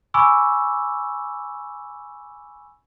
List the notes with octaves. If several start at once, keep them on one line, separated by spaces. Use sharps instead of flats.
G#5 B5 C#6 D6 E6